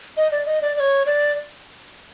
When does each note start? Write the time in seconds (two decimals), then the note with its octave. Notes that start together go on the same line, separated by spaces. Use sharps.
0.17 D#5
0.31 D5
0.46 D#5
0.62 D5
0.76 D5
0.80 C#5
1.06 D5